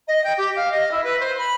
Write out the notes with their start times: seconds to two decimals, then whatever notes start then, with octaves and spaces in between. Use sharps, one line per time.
0.07 D#5
0.24 G5
0.37 G4
0.56 F5
0.71 D#5
0.91 E4
1.03 B4
1.19 C5
1.38 B5